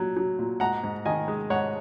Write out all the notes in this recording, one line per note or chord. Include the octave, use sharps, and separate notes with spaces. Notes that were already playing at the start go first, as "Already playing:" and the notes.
Already playing: A#2 F#3
F#3
A#2
G#2 F#5 A#5
G#2
D#3 D#5 G#5
G#3
G#2 C#5 F#5